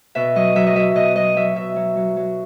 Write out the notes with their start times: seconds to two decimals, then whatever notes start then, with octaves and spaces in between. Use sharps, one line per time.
0.15 B2 E5
0.36 F#3 D#5
0.55 F#3 E5
0.67 D#5
0.75 F#3 E5
0.95 B2 D#5
1.16 F#3 D#5
1.36 F#3 E5
1.56 B2 E5
1.76 F#3
1.96 F#3
2.16 F#3